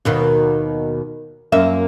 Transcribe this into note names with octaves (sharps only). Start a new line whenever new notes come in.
D#2 B2 D#3
F#2 A#3 E5